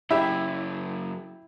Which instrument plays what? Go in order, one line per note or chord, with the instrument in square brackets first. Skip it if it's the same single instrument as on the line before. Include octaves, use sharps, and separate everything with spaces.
[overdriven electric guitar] F#2 C#3 [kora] E4 [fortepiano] G4 E5